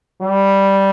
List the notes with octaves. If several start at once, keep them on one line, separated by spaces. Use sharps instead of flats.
G3